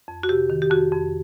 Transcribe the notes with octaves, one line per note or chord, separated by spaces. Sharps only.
F2
F#4
C3 G4
D#3
G4
F2 F#4
F2